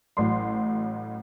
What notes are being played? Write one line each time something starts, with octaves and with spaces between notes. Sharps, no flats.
A1 A2 F#3 C6